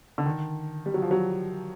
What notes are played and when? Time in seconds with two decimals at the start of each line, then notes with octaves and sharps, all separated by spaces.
0.18 D3
0.26 D#3
0.86 G3
0.94 F#3
1.02 F3
1.11 F#3